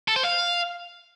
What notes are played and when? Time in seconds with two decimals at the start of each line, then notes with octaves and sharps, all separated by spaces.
0.08 A4
0.16 C5
0.24 F5